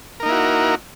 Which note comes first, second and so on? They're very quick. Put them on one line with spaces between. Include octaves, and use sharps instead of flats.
A#4 D#4 A#3 E4 F#4